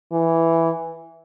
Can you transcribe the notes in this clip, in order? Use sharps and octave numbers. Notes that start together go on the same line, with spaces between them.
E3